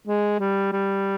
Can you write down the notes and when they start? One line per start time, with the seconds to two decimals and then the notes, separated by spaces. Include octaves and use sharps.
0.07 G#3
0.40 G3
0.72 G3